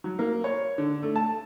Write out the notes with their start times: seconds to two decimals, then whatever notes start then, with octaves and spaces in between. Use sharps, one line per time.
0.04 F#3
0.19 A#3
0.44 C#5
0.78 D3
1.02 A3
1.16 A5